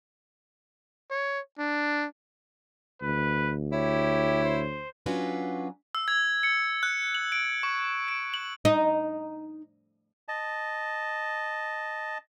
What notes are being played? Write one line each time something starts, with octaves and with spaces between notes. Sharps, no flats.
C#5
D4
D2 B4
E4 G4 C#5
C5
F#3 C#4 D4 F4 F#4 B4
E6
G#6
C#7
F#6
F#7
D7
C#6
D7
F#7
D#4
D#5 A5